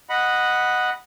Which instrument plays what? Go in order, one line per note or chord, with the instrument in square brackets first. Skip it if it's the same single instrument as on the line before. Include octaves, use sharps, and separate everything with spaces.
[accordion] D#5 F#5 B5